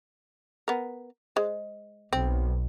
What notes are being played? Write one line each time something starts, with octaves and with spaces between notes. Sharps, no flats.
B3 A#4
G#3 C5
B1 C4